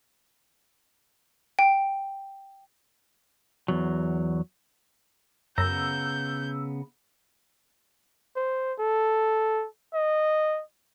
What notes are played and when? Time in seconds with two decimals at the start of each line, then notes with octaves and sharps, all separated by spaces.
1.59 G5
3.68 E2 F#3
5.58 F#2 C#3 B3 A#5 E6 G6
8.36 C5
8.78 A4
9.93 D#5